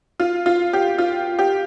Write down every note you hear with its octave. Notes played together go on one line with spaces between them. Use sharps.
F4
F4
G4
F4
G4